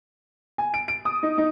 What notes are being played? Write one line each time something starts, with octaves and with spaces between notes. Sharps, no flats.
G#5
D7
D7
D#6
D#4
D#4